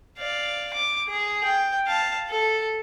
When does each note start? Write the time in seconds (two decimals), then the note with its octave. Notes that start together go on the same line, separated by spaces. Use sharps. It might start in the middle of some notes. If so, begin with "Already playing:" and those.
0.18 D5 F5
0.74 D6
1.08 G#4
1.44 G5
1.88 F5 A5
2.30 A4